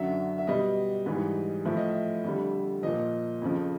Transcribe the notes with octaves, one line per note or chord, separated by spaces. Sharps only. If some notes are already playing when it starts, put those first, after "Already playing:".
Already playing: F#2 D3 F#3 E5
E5
B2 G3 D#5
G#2 E3 G3
A2 F3 E5
D#5
E5
F2 D3 G3
A#2 F3 D#5
F2 C#3 F3